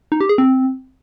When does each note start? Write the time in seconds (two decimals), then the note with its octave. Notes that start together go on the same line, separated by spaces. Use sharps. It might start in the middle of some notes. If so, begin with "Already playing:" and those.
0.12 D#4
0.21 G4
0.29 G#4
0.38 C4